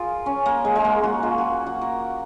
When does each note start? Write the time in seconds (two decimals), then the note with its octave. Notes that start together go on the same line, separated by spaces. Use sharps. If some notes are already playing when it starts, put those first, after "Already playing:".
Already playing: F4 G#4 A#4
0.26 C#4
0.46 A#3
0.65 G#3
0.76 G#3
0.85 A#3
1.04 F#4
1.23 F4
1.38 F#4
1.67 F#4
1.81 A#4